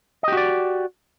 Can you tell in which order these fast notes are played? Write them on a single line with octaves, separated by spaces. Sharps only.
D#5 G4 F#4 D5